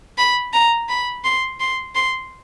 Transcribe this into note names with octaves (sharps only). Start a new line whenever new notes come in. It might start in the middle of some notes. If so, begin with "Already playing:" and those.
B5
A#5
B5
C6
C6
C6